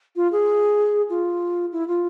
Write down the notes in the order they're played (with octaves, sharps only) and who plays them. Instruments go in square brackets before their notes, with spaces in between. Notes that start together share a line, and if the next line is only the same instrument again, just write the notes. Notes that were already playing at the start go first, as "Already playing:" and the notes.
[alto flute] F4
G#4
F4
E4
F4